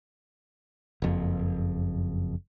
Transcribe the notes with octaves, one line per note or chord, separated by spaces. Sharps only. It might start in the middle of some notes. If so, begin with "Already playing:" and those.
F#1 F2